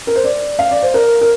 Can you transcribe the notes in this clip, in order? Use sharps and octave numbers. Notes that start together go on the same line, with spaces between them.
A#4
C5
D5
F5
D5
C5
A#4
A#4